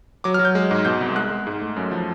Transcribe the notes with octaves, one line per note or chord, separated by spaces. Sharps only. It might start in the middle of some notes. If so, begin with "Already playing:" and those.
F#3 D6
F6
F#3
G6
G#3
G#2
B2 G6
C2
G#3 F#6
G#3
G#2
A3
F#2
F3